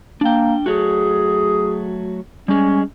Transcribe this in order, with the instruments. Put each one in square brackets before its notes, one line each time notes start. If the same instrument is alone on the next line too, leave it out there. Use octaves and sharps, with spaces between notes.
[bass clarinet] A#3 [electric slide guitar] D4 G5
[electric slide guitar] F#3 A3 F#4 [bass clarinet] G#4
[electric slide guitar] G3 G#3 [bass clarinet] C#4